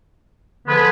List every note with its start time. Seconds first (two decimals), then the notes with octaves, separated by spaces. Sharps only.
0.66 D3 F3 G#3 B3 B4